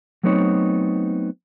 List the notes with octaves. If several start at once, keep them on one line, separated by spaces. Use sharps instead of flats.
F#3 A3 B3 C4 D#4 C#5